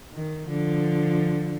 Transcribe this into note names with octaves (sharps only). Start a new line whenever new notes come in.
D#3
D3 F3